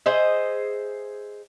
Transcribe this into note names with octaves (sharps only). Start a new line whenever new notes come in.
G#4 C5 D#5 E5